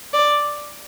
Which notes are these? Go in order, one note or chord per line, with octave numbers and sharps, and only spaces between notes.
D5